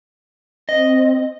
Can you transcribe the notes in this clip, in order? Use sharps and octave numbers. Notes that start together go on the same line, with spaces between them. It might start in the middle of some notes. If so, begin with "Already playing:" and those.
C4 D#5